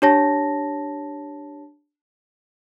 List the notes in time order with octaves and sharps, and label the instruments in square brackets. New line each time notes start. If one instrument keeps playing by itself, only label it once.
[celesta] D4 G4 C#5 A5 A#6